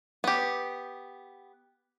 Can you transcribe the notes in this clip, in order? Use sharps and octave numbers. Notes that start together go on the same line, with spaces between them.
B3 G4